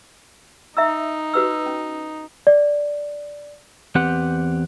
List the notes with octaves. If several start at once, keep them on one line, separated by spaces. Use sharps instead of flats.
D#4 E5 A#5 E6
F#4 B4 E6
C#4
D5
E2 C4 G4 B4 F#5